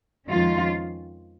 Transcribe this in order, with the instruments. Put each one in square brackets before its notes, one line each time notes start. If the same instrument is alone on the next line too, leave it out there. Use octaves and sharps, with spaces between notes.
[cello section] F2 D#3 G#3 C#4 F4